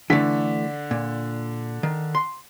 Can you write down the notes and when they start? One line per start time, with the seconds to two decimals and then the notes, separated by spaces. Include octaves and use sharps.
0.10 D3 E3 A3 D4 B6
0.91 A#2
1.83 D#3
2.15 C6